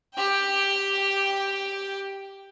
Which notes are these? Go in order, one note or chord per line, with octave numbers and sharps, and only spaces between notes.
G4 G5